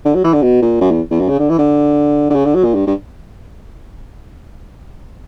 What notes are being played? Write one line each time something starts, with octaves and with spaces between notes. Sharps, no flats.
D3
F#3
E3
D3
B2
A#2
F#2
E2
E2
F#2
C#3
D3
E3
D3
D3
C#3
D3
F#3
A#2
G2
G2